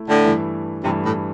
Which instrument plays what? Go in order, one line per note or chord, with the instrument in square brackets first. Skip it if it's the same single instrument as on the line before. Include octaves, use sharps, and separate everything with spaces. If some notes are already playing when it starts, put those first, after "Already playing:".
Already playing: [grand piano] A3 E4
[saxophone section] A2 D3
[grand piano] G2 E3 A3 E4
[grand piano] G2 E3 A3 E4 [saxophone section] C3
[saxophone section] A2